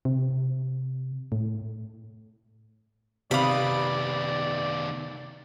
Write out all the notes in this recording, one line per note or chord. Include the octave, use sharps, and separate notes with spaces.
C3
A2
C3 D#3 B3 D5 F5 B5 D#6 F7